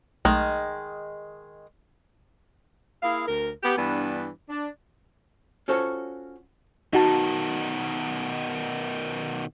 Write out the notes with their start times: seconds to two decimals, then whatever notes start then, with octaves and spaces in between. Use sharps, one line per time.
0.25 B1 D#3 G#3 A3 F6
3.03 A#3 E4 G#4 F5
3.26 D2 A#4
3.63 B3 G4
3.77 G2 E3 G3 B3 D4
4.49 D4
5.68 C#4 F4 F#4 A4 C5 C#5
6.93 B2 D#3 D#4 F#4 A5